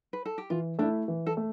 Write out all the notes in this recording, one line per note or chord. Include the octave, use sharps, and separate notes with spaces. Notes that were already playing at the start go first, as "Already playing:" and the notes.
B4
A4
G4
E3 F4
A3 D4 E4
E3
A4
A3